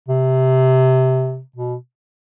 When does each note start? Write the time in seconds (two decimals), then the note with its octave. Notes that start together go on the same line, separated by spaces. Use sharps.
0.08 C3
1.56 B2